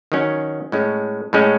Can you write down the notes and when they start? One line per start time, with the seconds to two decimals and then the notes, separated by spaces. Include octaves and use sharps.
0.12 D#3 F#3 C#4
0.72 A2 G#3 C#4
1.33 A2 G#3 C#4